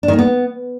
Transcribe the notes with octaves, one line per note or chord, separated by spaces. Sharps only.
D4
D#3
A#3
B3